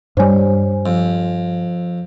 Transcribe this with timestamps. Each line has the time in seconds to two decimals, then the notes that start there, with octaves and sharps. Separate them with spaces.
0.17 G2 G3 C5 C#5 G#5
0.86 F2